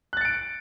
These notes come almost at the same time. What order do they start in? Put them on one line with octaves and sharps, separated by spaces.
F#6 A6 C#7 D7